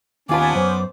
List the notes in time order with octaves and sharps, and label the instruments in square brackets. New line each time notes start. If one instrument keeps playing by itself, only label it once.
[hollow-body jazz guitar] D#2 F4 B4 [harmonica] B3 C#4 [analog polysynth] G#5 A5 [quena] D6
[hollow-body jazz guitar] F#2 [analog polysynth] C5